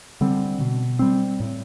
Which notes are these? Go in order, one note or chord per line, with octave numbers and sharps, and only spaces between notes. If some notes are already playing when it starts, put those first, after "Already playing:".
D3 G3 C4
B2
G3 C4
A2